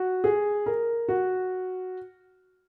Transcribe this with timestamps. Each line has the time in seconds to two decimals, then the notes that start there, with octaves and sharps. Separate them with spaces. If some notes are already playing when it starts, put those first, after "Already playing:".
Already playing: F#4
0.24 G#4
0.66 A#4
1.08 F#4